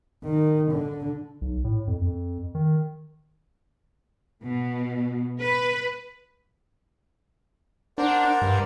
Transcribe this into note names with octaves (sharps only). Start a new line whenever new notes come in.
D#3
D3
B1
A2
F2
F2
D#3
B2
B4
D4 A#4 C5 D5 F#5
G2